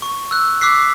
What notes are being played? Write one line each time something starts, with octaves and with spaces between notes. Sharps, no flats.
C#6
E6 F#6
D6 E6 F#6 B6 C7